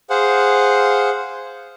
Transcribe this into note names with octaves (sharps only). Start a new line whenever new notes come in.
G#4 C5 F5 F#5